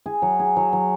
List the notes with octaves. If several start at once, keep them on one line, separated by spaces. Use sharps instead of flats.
G#4
F#3
G#4
F#3
F#3